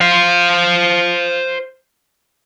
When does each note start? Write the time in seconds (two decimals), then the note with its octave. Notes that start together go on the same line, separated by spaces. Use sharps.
0.01 C5 F5